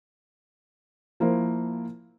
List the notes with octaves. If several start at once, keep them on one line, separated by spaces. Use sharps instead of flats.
F3 A#3 E4 A#4 C5